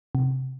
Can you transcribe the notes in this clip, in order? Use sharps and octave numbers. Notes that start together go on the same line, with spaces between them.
C3